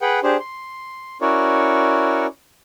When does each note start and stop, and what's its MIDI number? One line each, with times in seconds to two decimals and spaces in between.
0.01 0.20 68
0.01 0.20 71
0.01 0.20 78
0.01 0.20 79
0.23 0.37 62
0.23 0.37 67
0.23 0.37 68
0.23 0.37 72
0.40 1.18 84
1.21 2.27 61
1.21 2.27 64
1.21 2.27 66
1.21 2.27 70
1.21 2.27 73
1.21 2.27 74